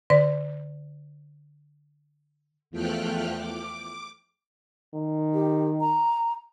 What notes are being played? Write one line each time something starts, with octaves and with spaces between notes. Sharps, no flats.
D3 D5
E2 F3 A3 G5 F6 F#6
D6
D#3
G4
A#5